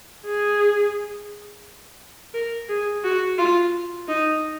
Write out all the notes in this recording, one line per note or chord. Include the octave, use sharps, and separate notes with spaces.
G#4
A#4
G#4
F#4
F4
D#4